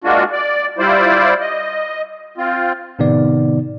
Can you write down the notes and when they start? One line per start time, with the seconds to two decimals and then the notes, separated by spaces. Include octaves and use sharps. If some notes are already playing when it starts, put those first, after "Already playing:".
0.04 G#3 A#3 D4 F4 F#4
0.32 D5
0.79 G3 E4 F4 C5 D5
1.41 D#5
2.38 C4 F4
2.99 A2 C3 D#3 B3 D#4 D5